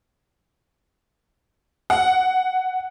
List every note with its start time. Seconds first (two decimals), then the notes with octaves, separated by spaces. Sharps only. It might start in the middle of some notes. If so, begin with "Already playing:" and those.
1.90 F#5